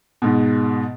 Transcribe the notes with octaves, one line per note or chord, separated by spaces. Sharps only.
G#2 B2